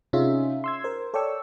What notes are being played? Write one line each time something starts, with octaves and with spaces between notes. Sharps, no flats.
C3 C#4 D#4 F4 G#4 E5
C6 E6 G#6
A#4 C5
A4 C#5 D5 G5 C#6 E6